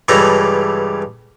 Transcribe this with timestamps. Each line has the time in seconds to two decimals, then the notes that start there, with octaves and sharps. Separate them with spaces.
0.08 C#2 G2 C#3 E3 A4 A#5